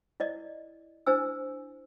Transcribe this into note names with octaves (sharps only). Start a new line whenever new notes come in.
E4 D5 D#5
D4 E4 C5 G#5 E6